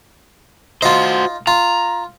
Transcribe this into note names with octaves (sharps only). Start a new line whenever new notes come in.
D#4 F4 F#4 C5
F4 A#5